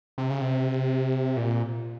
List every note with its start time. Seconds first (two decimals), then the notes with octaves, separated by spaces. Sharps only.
0.18 C3
0.30 C#3
0.41 C3
1.37 A#2